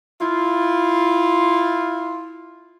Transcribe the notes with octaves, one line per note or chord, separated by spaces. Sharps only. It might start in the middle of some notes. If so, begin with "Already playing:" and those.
E4 F4